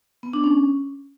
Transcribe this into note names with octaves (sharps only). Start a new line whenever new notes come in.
B3
D4
C#4